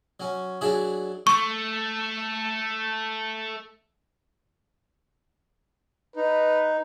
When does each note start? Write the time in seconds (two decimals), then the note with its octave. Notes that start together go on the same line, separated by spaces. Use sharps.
0.20 F#3 C#4
0.61 F#3 D4 E4 F#4 G#4
1.27 A3 C#6
6.16 D#4 B4